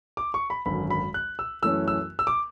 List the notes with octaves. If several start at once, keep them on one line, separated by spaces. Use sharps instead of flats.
D6
C#6
B5
G#1 F#2 D3 B5
B5
F#6
E6
F#2 E3 A3 C#4 E6
E6
E6
D6